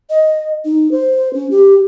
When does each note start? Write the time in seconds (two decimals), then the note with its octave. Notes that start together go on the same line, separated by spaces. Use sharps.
0.10 D#5
0.65 D#4
0.92 C5
1.34 C#4
1.51 G4